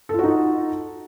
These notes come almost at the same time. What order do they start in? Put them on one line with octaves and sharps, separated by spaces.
A4 F4 F#4 D#4 D#5